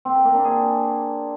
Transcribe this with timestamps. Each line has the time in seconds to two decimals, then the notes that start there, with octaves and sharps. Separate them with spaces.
0.05 C4
0.15 A#4
0.25 A#3
0.35 D4
0.45 G#4